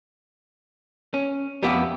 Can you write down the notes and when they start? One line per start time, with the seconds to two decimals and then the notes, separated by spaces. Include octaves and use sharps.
1.14 C#4
1.62 F2 B3 G4 E5